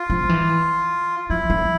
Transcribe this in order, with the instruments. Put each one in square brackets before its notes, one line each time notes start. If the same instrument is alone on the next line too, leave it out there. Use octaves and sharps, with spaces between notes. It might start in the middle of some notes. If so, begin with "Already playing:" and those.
Already playing: [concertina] F4
[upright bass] F3
E3
[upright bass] F3 [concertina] E4
[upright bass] F3